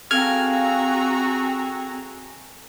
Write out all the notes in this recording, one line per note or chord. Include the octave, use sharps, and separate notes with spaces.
C4 F#4 G#4 A4 F5 A#5 F6 G#6